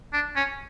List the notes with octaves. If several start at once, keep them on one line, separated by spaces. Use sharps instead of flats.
D4
C#4